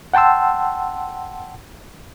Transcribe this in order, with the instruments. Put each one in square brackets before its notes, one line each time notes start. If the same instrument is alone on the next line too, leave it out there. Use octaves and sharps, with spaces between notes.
[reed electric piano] F#5 G5 A5 C6 E6